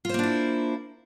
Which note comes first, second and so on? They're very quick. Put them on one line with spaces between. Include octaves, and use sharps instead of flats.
F4 C5 A#3 D4 E4